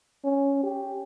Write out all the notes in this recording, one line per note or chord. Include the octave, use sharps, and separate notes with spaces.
C#4
G4